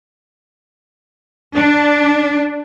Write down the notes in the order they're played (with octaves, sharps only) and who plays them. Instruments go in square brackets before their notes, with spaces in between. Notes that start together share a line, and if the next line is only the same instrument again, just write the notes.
[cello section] D4